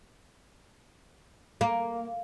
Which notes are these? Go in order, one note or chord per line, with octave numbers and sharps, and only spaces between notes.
A#3